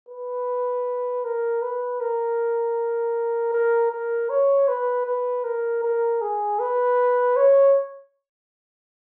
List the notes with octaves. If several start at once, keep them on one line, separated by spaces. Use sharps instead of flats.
B4
A#4
B4
A#4
A#4
A#4
C#5
B4
B4
A#4
A#4
G#4
B4
C#5